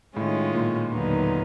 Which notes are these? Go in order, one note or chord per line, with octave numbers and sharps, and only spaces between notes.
A2 D#3 G#3 C#4 F4
A#2
D#2 D3 F#3 B3 D#4